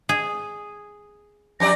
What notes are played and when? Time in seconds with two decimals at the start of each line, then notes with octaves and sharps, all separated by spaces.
0.09 G#4
1.60 F2 G4 D5 A#6